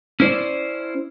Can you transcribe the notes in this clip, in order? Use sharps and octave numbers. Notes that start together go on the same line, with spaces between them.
C#4 E4 C5 D5